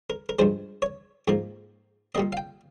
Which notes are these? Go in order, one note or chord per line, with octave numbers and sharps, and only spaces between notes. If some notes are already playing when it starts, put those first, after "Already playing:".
A#4
A#4
G2 F3 G#3 C5
C#5
G#2 F3 A#3
A#2 G3 A#3 D#5
F5
G5